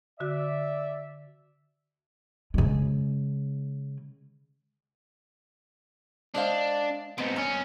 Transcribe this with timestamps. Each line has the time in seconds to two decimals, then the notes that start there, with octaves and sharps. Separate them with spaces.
0.20 D3 F#4 D5 E5
2.54 C#3 G#3
6.35 G#3 D4 C5 F5
7.18 B3 C4 D#4
7.36 C2 C#4 A#5